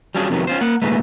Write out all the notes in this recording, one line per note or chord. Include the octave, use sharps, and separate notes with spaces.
F#3 G3 C#4 D4 F4 G#4
F2 C3 D#3 F#3 B3
C#4 F4 C5
A#3 F#5
D#2 A#2 G#3 A3 D#4 B4